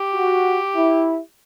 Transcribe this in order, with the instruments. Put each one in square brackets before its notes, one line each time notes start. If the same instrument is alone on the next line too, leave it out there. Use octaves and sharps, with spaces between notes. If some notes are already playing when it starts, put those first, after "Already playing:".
Already playing: [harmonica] G4
[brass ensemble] F#4
E4